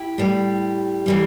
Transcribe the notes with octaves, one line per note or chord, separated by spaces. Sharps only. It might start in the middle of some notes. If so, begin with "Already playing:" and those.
Already playing: E4 G4
A2 G3
A2 E3 G3